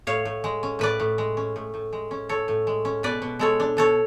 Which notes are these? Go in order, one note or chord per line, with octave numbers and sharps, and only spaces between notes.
A2 C#5 F5
A2
G#3
C#4
A2 B4 D5
A2
G#3
C#4
A2
A2
G#3
C#4
A2 A4 C#5
A2
G#3
C#4
B2 B4 D5
B2
G#3 A4 C#5
D4
B2 A4 C#5